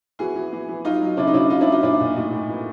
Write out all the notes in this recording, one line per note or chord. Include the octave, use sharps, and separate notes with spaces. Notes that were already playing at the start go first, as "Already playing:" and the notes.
E3 F#4 G#4
E3
E3
E3
F#3 D#4 F4
F#3
C#3 D4 E4
D#4
C#3 D4 E4
F#3 D#4 F4
D4 E4
F#3 D#4
A#2 D4 E4
A#2
A2 D#4
A2
E3